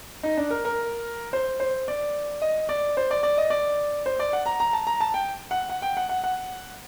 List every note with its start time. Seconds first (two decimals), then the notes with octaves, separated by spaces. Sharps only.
0.23 D#4
0.37 D4
0.50 A#4
0.65 A#4
1.33 C5
1.60 C5
1.88 D5
2.42 D#5
2.69 D5
2.97 C5
3.11 D5
3.23 D5
3.38 D#5
3.50 D5
4.06 C5
4.19 D5
4.33 F#5
4.46 A#5
4.60 A#5
4.73 A5
4.87 A#5
5.00 A5
5.14 G5
5.51 F#5
5.69 F#5
5.82 G5
5.97 F#5
6.09 F#5
6.24 F#5